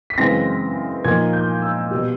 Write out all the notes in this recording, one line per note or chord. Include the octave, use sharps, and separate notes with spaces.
B6
F#2 C#3 E3 G#3 C4 A#6
A#2 F3 A#3 D#4 G#6
G6
E6
B2 G3